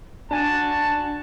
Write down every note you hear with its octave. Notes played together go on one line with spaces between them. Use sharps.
D4 F#4 G#5 A5